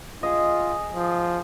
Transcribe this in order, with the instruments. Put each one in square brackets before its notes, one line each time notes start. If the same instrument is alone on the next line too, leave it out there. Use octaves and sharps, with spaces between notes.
[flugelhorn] F4 [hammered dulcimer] G#4 D#5
[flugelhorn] F3